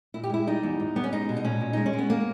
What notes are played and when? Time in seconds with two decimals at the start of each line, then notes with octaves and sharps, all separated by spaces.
0.14 A#2 E4
0.23 G4
0.30 G#3 E4
0.47 G3 D#4
0.63 E2
0.80 G#2
0.96 G3 B3
1.04 C#4
1.12 G#3 D#4
1.29 B2
1.37 D#4
1.45 A#2 C#4
1.61 A#2
1.73 G#3 D#4
1.86 C#4
1.93 G#3
1.98 B3
2.10 A#3